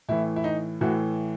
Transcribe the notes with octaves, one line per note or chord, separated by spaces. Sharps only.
A2 E3 E4
E4
D#4
A2 E3 F#4